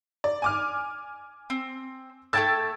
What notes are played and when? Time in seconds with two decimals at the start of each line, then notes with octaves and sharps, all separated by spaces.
0.24 D5
0.42 G#5 D6 F6
1.50 C4
2.33 A3 G5 A5 E6 G#6 A6